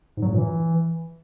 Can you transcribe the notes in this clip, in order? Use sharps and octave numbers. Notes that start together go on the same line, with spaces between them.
G#2
F#3
G2
A#2
E3